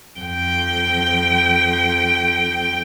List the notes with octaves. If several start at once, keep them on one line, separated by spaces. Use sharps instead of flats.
F2 G5